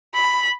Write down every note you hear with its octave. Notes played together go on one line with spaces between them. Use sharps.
B5